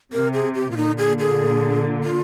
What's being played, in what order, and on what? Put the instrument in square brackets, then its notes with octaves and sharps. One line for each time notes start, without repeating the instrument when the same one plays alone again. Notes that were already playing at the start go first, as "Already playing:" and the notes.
[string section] C3 [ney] A#4
[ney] G#4
G4
F4
[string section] A#2 D3 [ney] D#4
[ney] G#4
G#4
F4